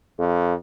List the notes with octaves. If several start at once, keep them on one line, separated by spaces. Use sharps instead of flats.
F2